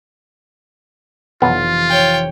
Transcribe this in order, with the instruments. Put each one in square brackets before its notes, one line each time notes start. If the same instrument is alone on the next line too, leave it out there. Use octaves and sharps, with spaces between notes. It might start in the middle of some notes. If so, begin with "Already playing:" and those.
[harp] F1 E3 [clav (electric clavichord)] B1 B3 [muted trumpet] F4
[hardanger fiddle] C#5 G5